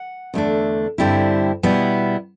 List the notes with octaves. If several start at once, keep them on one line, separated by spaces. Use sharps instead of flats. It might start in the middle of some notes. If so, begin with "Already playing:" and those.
Already playing: F#5
E2 D3 A3 D4
G2 D3 G3 C4 E4
B2 G3 B3 E4